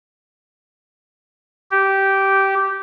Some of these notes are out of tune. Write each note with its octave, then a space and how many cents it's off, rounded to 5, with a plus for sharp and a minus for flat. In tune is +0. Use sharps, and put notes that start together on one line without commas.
G4 -10